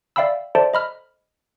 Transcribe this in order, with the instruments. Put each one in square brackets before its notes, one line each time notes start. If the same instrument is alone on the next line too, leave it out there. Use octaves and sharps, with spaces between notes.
[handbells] D5 E5 F5 G5 B5 E6
A4 C5 D5 E5 A5
D#5 B5 F6